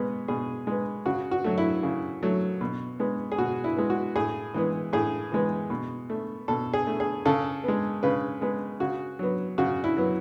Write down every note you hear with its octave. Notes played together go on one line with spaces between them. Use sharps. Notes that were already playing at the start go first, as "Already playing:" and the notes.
Already playing: B2 G#3 B3
B2 G#4
G#3 B3
C#3 F#4
F#4
F#3 A3
E4
C#3
F#3 A3
B2
G#3 B3
G#4
B2 F#4
E4
G#3 B3
F#4
A2 G#4
E3 G#3 B3
A2 G#4
E3 G#3 B3
B2
A3
B2 A4
G#4
A3
G#4
C#3 A4
G#3 B3
C#3 B4
G#3 B3
C#3 F#4
F#3 B3
C#3 F#4
E4
F#3 B3